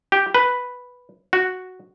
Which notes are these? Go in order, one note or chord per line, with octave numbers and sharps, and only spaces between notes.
G4
B4
F#4